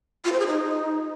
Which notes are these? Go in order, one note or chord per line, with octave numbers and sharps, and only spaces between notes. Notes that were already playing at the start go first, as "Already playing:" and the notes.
F4
C5
G#4
D#4